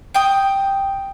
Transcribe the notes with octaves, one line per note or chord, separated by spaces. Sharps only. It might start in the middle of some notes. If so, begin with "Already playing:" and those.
G5 D#6